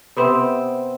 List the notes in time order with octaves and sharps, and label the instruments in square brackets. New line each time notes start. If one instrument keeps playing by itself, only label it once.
[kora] C3 B3 C4